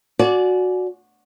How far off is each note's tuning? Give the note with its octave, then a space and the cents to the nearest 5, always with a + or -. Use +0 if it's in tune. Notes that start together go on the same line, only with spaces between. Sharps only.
F#4 -15 D5 -10 G#5 +30